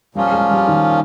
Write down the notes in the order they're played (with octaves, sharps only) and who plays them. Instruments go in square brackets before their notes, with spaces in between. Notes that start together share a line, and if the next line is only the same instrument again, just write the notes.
[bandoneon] A#2 F3 A#3 C#4 F4 [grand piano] G3
[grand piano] G#3
G3
D#3